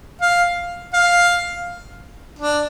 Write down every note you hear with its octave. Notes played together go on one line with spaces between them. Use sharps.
F5
F5
D4